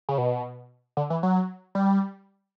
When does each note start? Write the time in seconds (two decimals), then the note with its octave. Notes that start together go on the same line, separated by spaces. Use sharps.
0.09 C#3
0.18 B2
0.97 D3
1.10 E3
1.23 F#3
1.75 G3